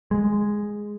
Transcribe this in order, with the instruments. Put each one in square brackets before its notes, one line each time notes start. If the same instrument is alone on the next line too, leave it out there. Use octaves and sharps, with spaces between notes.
[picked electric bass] G#3